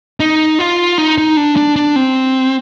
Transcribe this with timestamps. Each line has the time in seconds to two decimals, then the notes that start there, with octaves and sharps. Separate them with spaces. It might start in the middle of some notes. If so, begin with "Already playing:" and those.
0.20 D#4
0.59 F4
0.98 D#4
1.18 D#4
1.37 D4
1.57 D4
1.76 D4
1.96 C4